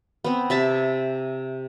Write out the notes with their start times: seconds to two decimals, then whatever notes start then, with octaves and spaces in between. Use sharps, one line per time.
0.24 B3 C4
0.50 C3 E5 A5